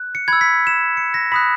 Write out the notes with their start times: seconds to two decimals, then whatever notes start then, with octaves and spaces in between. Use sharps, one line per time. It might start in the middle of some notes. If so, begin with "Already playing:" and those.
Already playing: F#6
0.15 C#7
0.28 B5 E6 G#6
0.41 B6
0.67 E7
0.97 C#7
1.14 A#6
1.32 B5 D#6 F#6 B6